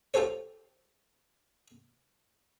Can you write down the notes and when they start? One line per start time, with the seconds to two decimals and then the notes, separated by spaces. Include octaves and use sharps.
0.14 F4 G4 A4 C5 C#5